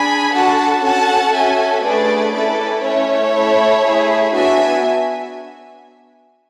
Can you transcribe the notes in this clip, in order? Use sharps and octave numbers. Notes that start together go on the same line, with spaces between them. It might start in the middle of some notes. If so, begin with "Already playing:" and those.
Already playing: D4 G#4 G#5 B5
D4 F#4 A4 F#5 A5
C#4 F#4 A4 F#5 A5
C#4 F#4 A4 E5 G#5
A3 D4 G#4 B4 D5
C#4 E4 A4 B4 D5
A3 C#4 E4 C#5 E5
A3 E4 A4
A3 E4 G#4
B3 D4 F#4 E5 G#5